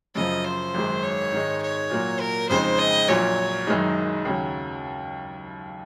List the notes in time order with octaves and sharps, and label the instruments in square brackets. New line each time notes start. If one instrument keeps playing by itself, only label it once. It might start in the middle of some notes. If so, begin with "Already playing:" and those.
[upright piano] F#2 C#3 F3 [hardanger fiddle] D#5
[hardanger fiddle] C5
[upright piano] G#1 F#2 D#3 G#3
[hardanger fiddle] C#5
[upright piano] G#2 D#3 G#3 D#4
[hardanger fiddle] C#5
[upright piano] A#2 F#3 A#3
[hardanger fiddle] A#4
[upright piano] F2 C#3 G#3 C4 D#4 [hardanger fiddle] C5
[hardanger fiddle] D#5
[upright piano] A#1 A#2 F#3 [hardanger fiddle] C#5
[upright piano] F#1 F#2 D#3 G#3 D#4
D#2 C#3 F#3